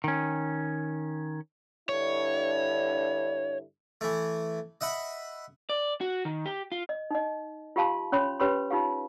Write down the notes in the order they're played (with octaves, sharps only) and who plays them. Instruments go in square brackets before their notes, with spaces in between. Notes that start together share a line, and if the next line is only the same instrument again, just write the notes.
[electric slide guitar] D#3 C#4
[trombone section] G2 D3 E4 [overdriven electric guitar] C#5
[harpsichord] E3 A3
D#5 E5 F#5 B5
[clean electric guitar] D5
F#4
D#3
G4
F4
[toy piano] D#5
D#4 D#5
F4 G4 F5 A5 C6
C#4 C#5 B5 C6
C#4 G4 B4 C#5 B5 C6
D#4 F4 G4 F5